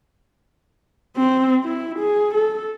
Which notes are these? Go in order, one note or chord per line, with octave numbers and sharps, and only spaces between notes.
C4
E4
G#4
A4